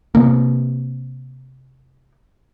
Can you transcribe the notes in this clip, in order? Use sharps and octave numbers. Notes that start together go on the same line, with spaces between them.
C3 A#3